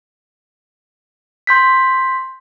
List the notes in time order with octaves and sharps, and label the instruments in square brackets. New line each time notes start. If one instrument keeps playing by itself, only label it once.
[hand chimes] C6 G6 B6